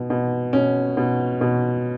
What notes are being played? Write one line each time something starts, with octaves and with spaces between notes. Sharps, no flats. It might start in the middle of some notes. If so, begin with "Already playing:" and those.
Already playing: B2
B2
B2 C#4
B2
B2